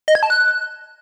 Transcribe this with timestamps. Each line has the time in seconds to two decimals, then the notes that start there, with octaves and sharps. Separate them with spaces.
0.08 D#5
0.15 G#6
0.23 A5
0.30 F#6